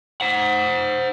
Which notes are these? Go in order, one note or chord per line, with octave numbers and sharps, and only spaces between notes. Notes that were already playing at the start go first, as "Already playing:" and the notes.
C5 F#5